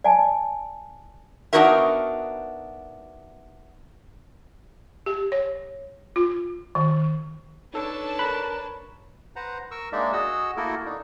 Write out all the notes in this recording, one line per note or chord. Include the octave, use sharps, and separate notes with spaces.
D5 G#5 A5
B3 D4 D#4 F#4 A#4 E5
G4
C#5
F4
D#3
D4 D#4 A4 B4 C#5 A5
A#4 B5 F#6
B4 C5 F#5 A#5
A#4 C#6 E6
G#3 A#3 D4 D#4 D5 E5
F#4 G#4 D#5 F#5 E6
A3 A#3 E4 F#4 A4 A#4
D4 D#4